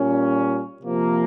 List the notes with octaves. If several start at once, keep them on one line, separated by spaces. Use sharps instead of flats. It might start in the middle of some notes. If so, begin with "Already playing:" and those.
Already playing: A#2 G3 C#4
C3 F3 A#3